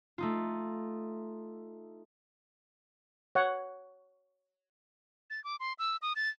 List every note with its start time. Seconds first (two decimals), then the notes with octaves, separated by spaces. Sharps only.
0.18 A3 D#4 F4
3.35 C#5 F#5
5.30 A6
5.44 D6
5.60 C6
5.79 E6
6.02 D#6
6.16 A6